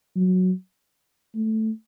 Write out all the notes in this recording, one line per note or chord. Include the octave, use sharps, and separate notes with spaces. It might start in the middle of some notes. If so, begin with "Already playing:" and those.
F#3
A3